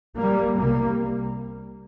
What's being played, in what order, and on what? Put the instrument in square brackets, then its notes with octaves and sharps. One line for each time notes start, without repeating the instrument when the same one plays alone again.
[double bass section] G3 A#3
C2 C3 G3 A#3